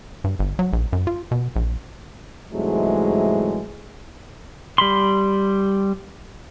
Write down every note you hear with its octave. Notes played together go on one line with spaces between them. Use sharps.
G2
G1
F#3
A#1
F#2
F4
B2
A#1
C2 G#2 E3 F#3 G#3 A3
G3 B5 C6